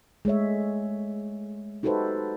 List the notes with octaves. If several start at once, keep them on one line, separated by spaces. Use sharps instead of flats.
G#3 A3 C#5 E5
D#4 F#4 G4 A4 B4 C5